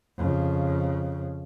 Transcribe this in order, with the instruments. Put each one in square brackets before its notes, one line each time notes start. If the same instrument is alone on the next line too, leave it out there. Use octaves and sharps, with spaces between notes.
[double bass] F2 C#3